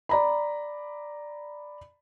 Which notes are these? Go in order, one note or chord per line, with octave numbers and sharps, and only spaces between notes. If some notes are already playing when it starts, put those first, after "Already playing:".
D5 A#5 B5